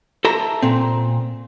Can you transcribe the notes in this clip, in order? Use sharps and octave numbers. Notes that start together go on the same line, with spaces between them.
A4 E5 A#5
A#2 C4